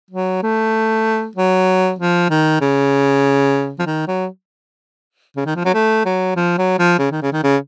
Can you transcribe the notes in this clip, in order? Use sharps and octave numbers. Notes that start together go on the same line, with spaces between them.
F#3
A3
F#3
F3
D#3
C#3
F3
D#3
F#3
C#3
D#3
F3
F#3
A3
F#3
F3
F#3
F3
C#3
D#3
C#3
D#3
C#3